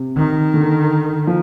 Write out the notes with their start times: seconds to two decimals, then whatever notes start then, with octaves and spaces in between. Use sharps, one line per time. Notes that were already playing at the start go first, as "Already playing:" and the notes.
Already playing: C3
0.17 D#3
0.54 D3
1.27 F3